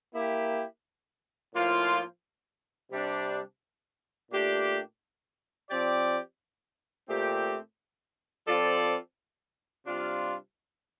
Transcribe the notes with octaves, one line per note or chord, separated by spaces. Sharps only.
A#3 E4 G4
A2 F3 A#3 F4 C5
C3 G3 D4
A#2 A3 D4 G4
F3 C4 G4 D5
A#2 A3 C4 G4
F3 C4 F4 A4 D5
C3 G3 D4 F4